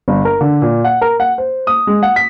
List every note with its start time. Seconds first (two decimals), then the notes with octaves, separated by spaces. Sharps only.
0.08 G1
0.25 A#4
0.41 D3
0.62 A#2
0.84 F#5
1.01 A#4
1.20 F#5
1.38 C5
1.67 D#6
1.87 G#3
2.03 F#5
2.16 B6